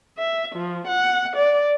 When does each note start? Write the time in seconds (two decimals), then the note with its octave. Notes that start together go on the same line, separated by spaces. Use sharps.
0.18 E5
0.55 F3
0.87 F#5
1.36 D5